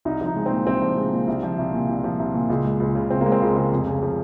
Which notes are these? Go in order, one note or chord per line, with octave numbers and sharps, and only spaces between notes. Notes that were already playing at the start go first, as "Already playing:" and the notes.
C2 D#4
F3
D#4
G#3
C4
A#2
C2 C4
F3
G#3
A#2
C2
F3
C2
A#2
C2
F3
C2
A#2
C#2
G#3
C#2
C#3
C#2 C4
A#3
G#3
C4
C#2
C#3
F1
C#3
F3